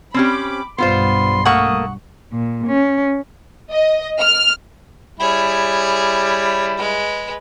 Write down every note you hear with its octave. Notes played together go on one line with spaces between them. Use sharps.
C4 C#4 G4 B5 D6
B1 G2 B3 F4 C5 C6
A3 A#3 F#5 C#6 D#6
A#2
C#4
D#5
F6
G3 E4 G#4 C#5
G#3 B4